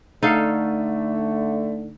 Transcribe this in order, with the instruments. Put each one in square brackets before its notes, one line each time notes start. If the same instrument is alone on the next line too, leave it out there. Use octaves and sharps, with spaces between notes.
[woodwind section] D3 A3 [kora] D#4 A4 F5